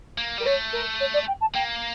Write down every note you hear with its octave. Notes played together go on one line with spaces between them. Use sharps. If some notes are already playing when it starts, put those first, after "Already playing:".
A#3
G3 A#4
A3 C#5
A#4
C#5
D5
G5
A5
A#3 G5